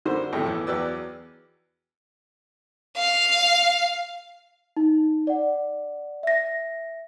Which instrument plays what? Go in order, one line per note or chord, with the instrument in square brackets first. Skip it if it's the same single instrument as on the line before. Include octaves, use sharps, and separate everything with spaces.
[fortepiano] D3 G3 F#4 A#4 C5
G#1 D#2 A2 A3 G5
E2 E3
E2 F#3 B4 D5 G5 E6
[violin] F5
[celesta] D#4
D5 F#5
E5 A#6